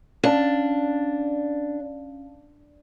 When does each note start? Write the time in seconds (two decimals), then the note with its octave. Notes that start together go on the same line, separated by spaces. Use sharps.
0.24 C#4 D4 F5 A5